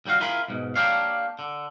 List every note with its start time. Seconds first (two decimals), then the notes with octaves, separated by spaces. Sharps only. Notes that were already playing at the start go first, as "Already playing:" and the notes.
0.05 D#2 G3 A#3 F#4 F5
0.20 E4 F4 G#4 A#4 B5
0.48 C#2 G#2 B2
0.76 A#3 B3 D4 G4 C#5 F5
1.39 D3